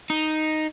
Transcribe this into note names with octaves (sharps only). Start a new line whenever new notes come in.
D#4